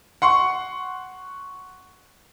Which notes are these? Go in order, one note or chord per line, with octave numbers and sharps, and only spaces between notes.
F#5 C6 C#6